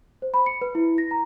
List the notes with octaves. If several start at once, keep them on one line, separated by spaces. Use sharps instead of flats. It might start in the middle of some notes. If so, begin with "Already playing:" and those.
C5
B5
C#7
B4
E4
A#6
A#5